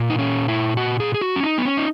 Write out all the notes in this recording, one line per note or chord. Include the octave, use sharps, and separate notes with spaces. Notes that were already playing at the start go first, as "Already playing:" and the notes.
Already playing: A#2
D#4
C#4
E4
F#4
G#4
G#4
F#4
C#4
D#4
B3
C#4
D#4